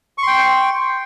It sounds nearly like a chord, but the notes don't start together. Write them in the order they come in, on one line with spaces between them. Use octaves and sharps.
C#6 C6 G5